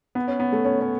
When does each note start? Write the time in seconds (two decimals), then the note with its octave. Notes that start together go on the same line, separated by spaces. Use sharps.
0.15 B3
0.28 C#4
0.40 B3
0.52 A3
0.65 C#4
0.81 C#4